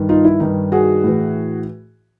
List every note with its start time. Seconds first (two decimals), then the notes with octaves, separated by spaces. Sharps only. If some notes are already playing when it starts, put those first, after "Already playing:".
Already playing: G2 D#3
0.09 D#4 F4
0.25 E4
0.40 G2 D#3 D#4
0.72 F#4 G#4
1.04 A2 E3